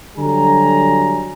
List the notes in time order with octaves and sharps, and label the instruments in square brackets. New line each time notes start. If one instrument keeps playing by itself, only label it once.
[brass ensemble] D3 F#3 G3 G#5 A#5